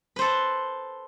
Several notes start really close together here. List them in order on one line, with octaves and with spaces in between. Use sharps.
B4 C5 A4